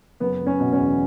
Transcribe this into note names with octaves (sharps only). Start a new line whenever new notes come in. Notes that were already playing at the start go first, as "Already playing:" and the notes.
F#1 B3
F#1
C#4
B2
C#4
E2